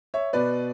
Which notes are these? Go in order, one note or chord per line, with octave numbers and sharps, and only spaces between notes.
C#5 E5
B2 B4 D5